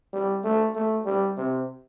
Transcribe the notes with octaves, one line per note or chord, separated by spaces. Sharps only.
G3
A3
A3
G3
C3